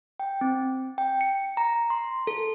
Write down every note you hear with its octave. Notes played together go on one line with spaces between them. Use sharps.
G5
C4
G5
C#7
A#5
C6
A4